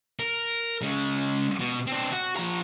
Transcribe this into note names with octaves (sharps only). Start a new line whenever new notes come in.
A#4
C#3 G#3
B2
C4 D4
F#4
F3 A#5